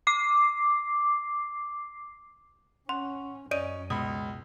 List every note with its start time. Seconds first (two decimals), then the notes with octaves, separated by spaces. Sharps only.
0.07 D6 C7
2.89 C#4 F#5 C6
3.51 F#2 C#4 D5 D#5 D7 D#7
3.90 C#2 B2 B5 D#6